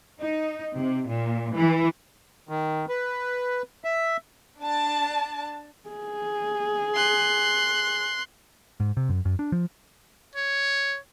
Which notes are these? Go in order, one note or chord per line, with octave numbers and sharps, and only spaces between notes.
D#4
C3
A#2
E3
D#3
B4
E5
D4 A5
G#4
C6 F#6
G#2
C3
F#2
F#2
D4
F3
C#5